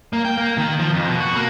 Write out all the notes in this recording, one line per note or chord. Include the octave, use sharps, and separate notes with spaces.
A#3
G5
A#3
D#3
F3
F2
B2
F#4
A#3